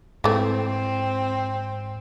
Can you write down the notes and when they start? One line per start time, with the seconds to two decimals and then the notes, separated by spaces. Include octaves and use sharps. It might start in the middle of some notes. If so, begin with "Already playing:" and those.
0.24 G#2 E3 A3 C4